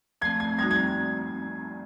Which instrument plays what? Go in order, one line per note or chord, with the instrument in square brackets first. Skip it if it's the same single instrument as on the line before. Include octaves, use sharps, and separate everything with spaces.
[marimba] F3 A3 C4 [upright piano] G#6
[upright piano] G#6
[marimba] G3 C4 D#4 F#4 [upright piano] G#6
[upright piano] G#6